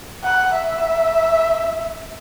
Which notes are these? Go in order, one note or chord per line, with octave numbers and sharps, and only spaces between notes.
F#5
E5